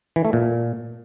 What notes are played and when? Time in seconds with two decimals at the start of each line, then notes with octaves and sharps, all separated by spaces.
0.16 E3
0.25 A3
0.33 A#2